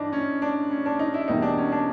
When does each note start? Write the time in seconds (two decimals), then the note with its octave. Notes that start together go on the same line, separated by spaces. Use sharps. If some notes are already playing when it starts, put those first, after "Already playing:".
Already playing: G2 E3 D4 D#4
0.13 C#4
0.42 D4
0.71 C#4
0.86 D4
0.99 D#4
1.14 E4
1.28 E2 B2 G3 A#3 D#4
1.42 D4
1.57 C#4
1.72 D4